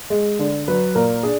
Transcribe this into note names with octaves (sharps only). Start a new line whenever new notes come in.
G#3
D3
F#3 B4
A#2 A#4
D4 G#4